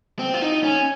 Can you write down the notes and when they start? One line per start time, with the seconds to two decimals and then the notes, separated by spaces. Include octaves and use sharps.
0.19 C4
0.34 F4
0.42 D#4
0.63 C#4